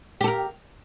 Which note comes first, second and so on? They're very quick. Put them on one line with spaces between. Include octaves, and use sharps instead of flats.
G4 A4 A#4